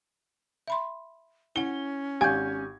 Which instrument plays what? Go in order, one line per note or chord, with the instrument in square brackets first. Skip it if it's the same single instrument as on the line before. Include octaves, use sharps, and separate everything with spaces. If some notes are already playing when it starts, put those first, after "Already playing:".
[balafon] E5 B5 C6
[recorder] C#4 [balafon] E4 F#5 [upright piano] G7
[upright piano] G#1 G#5 G#6 [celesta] G4 G6 [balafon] F5